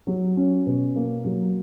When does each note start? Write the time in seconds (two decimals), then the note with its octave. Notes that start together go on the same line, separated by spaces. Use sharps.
0.07 F#3
0.37 C#4
0.66 B2
0.96 A#3
1.25 F#3